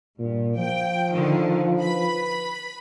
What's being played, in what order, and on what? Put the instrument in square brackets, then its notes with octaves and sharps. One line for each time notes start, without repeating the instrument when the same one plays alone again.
[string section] G2 [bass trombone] A#2
[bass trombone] F3 [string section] G5
[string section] D3 D#3
B4 B5